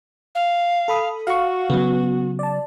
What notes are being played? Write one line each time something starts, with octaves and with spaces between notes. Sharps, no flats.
F5
A4 B5 D#6
F#4 F5 C#6
C#3 F#3 B3
D5 A5